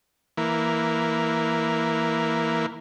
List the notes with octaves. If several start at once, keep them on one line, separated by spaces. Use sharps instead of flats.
E3 A#3